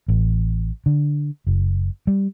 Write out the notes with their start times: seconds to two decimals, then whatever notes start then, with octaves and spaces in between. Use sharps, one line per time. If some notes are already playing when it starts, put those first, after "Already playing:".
0.08 A1
0.86 D3
1.47 F#1
2.07 G3